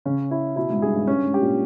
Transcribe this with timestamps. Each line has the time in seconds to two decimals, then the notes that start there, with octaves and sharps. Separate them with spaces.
0.05 C#3 C#4
0.31 E4
0.56 B2 E4
0.70 G#2
0.82 G2 G#4
0.95 G#2
1.07 G2 C#4
1.25 G#2
1.34 G4
1.41 A#2